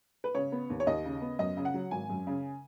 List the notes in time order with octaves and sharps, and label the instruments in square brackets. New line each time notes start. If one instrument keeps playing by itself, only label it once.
[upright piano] B4
C#3 C#5
B3
D#2
C#5
D#2 D#5
C#3
B3
F#2 D#5
C#3
F#5
F#3
G#1 G#5
F#2
C#3